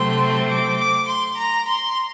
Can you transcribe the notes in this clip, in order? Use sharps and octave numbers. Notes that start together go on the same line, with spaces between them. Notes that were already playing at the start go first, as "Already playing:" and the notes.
Already playing: C3 F#3 A3 C4 C6
D6
D6
C6
A#5
C6